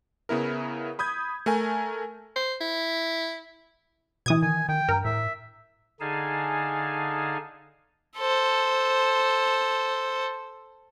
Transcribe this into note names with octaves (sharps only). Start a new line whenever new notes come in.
C#3 B3 E4 A#4
B5 D#6 G6 G#6
A3 A#4 G#5
C5
E4
B2 E3 D#6 G#6
D#3 G#5
D#3 G5
G2 A#4
A2 E5
D3 D#4 G#4 F5 G#5 A5
A4 C5